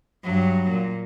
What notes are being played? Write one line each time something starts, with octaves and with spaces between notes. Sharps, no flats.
G2 F#3
A#2